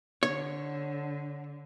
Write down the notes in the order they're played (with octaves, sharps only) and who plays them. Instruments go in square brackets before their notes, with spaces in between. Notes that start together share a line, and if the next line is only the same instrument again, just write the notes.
[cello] D3 [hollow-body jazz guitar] C#5